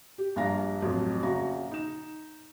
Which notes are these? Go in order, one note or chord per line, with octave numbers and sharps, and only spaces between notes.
G4
A#1 G2 D4 F5 A#5 A#6
A1 F2 F#3
A#1 C#3 F#4 A#5
D#4 E7